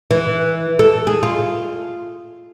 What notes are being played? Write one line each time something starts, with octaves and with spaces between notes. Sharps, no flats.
E3
A4
G#4
F4